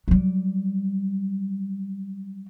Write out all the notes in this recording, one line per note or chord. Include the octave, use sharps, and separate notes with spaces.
F#3 G3